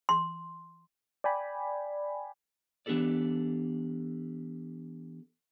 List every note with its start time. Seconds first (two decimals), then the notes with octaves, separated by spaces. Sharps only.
0.09 C6
1.24 D5 G5 G#5 B5
2.86 E3 B3 D4 G4 A4 D5